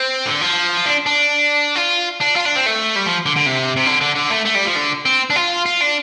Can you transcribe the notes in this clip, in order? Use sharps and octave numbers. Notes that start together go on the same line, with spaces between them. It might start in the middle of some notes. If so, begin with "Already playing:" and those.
Already playing: C4
D3
F3
F4
D4
D4
F4
D4
F4
D4
C4
A3
G3
F3
D3
D3
C3
C3
D3
D3
D3
A3
A3
G3
F3
D3
C4
D4
F4
F4
D4